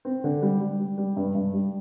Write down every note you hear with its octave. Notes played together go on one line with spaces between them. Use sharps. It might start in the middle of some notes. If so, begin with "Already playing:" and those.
C4
D3
G3
G3
G3
G3
G2
G2
G3